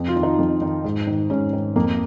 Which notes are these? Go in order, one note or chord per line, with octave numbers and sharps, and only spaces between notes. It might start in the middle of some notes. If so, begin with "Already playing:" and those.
Already playing: F2
F4
D#3
D#4
F2
D#3
G#2
D#3
G#2 C#4
D#3
F2 A#3